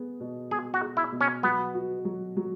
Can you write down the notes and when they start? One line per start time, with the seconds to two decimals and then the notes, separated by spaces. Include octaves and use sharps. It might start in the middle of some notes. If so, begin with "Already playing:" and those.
Already playing: B3 G#4
0.20 B2
0.51 B2 G#4
0.74 F#4
0.81 G#4
0.97 E4
1.12 B2
1.21 C#4
1.43 F#3 B3
1.75 F#4
2.05 F#3
2.37 F#3